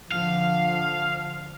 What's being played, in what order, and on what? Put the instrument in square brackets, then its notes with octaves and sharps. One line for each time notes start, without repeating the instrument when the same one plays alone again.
[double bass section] D3 F3 [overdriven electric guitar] F5